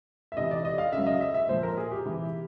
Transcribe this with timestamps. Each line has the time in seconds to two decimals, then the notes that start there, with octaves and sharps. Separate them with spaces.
0.32 E5
0.37 C3 E3 D#5
0.51 D5
0.65 D#5
0.78 F5
0.92 C#3 E5
0.98 F#3
1.07 D#5
1.21 E5
1.34 E5
1.48 A#2 F3 C5
1.63 A#4
1.77 G#4
1.91 G4
2.05 C3 E3